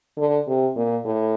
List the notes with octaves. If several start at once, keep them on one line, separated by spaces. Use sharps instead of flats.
D3
C3
A#2
A2